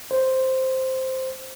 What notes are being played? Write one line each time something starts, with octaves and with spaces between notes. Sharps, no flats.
C5